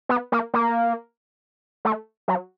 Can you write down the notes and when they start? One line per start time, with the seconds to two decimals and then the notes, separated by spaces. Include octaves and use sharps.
0.09 B3
0.32 A#3
0.54 A#3
1.85 A3
2.28 F#3